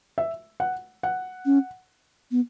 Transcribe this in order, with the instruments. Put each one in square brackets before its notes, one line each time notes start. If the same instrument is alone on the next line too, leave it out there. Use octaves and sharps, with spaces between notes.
[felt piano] E5
F#5
F#5
[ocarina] C#4
B3